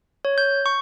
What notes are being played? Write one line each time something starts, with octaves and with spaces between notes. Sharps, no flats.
C#5
G6
C#6